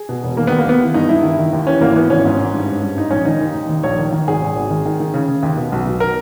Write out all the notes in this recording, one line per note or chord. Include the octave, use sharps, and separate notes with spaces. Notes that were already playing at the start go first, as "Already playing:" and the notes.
Already playing: G#4
B2
E1
D#3 A#3
D#2 B3
A#3
D#2 B3
E3
G2 D#4
G2 E4
D#3 E4
D#3
D#2
E3 C#4
G#1 A#3
E3 B3
G#1 C#4
G#2
G#2
G2
G2
G2
G#2 D#4
A#1 C#4
D#3 D#4
D#2
D#2
D#2
A#1 C#5
D#3
D#3
G#1 G#4
G#1
G#1
D#3
D#3
D#3
C#3
C#3
D#2
B2
B1
B2
A#4